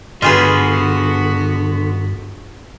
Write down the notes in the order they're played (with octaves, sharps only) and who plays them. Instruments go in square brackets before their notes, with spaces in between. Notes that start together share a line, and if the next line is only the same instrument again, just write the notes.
[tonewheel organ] G2 [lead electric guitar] D3 [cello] B3 F#4 [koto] F4 G#4 B4